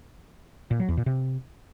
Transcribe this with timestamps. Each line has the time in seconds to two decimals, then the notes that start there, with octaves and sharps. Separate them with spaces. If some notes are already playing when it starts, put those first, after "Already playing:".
0.71 A#2
0.80 F#3
0.88 E2
0.97 A#2
1.06 C3